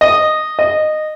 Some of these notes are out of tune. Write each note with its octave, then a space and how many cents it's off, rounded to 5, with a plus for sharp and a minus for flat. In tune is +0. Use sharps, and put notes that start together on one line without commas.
D#5 -10
D#5 -15